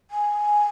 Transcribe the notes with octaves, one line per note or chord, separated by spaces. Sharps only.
G#5